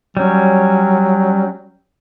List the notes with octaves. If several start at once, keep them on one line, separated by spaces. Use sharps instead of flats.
F#3 G3 C#4